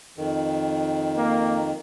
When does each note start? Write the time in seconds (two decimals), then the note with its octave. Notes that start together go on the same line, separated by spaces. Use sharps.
0.18 F2 D#3
1.17 A#3